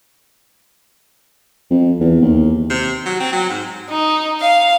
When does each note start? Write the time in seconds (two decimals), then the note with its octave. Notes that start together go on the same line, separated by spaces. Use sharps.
1.70 F2
2.00 E2
2.22 D#2
2.70 C3
3.06 F#3
3.20 C4
3.32 F#3
3.49 G#2
3.89 D#4
4.40 F5